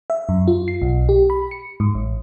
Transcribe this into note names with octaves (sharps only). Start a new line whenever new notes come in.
E5
F#2
F4
C7
B1
G4
B5
C#7
G#2
A1